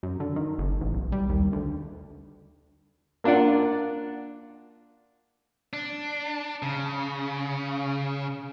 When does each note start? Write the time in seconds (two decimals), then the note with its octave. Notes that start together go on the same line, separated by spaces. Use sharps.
0.03 F#2
0.20 D3
0.36 D#3
0.58 F#1
0.81 A1
0.94 B1
1.12 G3
1.29 D#2
1.53 D2
3.24 A#3 D4 F4 D5 F#5
5.73 D4
6.62 C#3